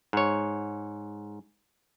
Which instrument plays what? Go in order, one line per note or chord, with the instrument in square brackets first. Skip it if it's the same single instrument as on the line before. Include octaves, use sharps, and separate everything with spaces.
[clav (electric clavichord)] G#2 C#5